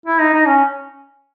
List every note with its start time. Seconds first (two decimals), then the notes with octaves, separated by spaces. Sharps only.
0.06 E4
0.20 D#4
0.34 D#4
0.47 C#4